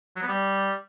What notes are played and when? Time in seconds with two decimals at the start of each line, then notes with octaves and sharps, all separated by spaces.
0.16 F#3
0.22 B3
0.28 G3